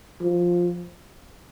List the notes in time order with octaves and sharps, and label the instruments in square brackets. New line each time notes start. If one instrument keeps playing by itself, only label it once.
[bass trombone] F3